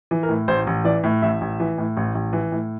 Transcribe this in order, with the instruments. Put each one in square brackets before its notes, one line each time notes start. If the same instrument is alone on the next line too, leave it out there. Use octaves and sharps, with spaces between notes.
[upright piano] E3
A#4
A2
A1 C5
A1
E3 D5
A2
A1 E5
A1
E3
A2
A1
A1
E3
A2